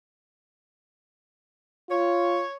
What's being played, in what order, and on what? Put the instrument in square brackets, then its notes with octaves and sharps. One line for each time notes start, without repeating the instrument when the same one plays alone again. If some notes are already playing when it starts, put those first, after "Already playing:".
[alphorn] F4 [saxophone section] C#5